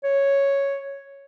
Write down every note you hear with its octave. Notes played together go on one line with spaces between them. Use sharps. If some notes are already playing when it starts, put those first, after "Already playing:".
C#5